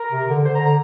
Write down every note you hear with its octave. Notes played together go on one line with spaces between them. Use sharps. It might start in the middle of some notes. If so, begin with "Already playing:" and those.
Already playing: A#4
C3
D3
D3 C5
A#5
D3
A#5